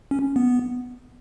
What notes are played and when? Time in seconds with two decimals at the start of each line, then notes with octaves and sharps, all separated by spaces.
0.11 C#4
0.36 B3